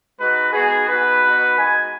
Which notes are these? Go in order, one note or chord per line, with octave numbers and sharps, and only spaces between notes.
G#3 D#4 F#4 B4
B3 D#4 F#4 G#4
B3 D#4 F#4 B4
B3 D#4 F#4
G#3 D#4 F#4 G#5